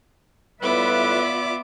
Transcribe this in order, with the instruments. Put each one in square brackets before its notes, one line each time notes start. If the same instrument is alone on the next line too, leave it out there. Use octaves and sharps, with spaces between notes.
[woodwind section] A2 G3 B4 [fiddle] B3 D6 [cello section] F4 D5 E5